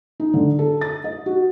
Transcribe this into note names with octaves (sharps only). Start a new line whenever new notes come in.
D#4
D3
A4
A6
D#5
F#4